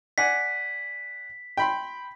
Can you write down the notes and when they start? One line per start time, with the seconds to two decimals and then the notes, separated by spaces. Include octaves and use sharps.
0.18 D5 F#5 G#5 B6
1.57 G5 B5 C6